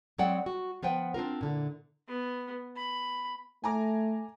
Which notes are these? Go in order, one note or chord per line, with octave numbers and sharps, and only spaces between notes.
F#3 G#3 C4 D5 F#5 G5
F#4
F3 B3 C5 F#5 G5
C4 D4 F4 A#4
A#2 D3 E4
B3
B5
A3 G#5 A#5 D6